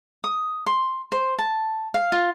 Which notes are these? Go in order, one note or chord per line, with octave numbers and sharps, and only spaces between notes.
D#6
C6
C5
A5
F5
F4